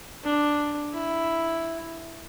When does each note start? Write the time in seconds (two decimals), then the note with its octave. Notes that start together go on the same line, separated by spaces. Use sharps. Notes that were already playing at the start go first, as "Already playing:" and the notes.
0.24 D4
0.93 E4